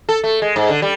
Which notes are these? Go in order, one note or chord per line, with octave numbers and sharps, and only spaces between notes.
A4
A3
G#3
G#2
D3
G3